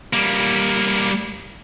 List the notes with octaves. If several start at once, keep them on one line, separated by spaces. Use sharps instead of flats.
G3 A#3